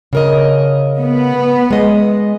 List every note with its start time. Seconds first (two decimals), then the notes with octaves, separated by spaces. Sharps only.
0.13 C#3 A#4 D#5
0.99 B3
1.71 G#3 D#5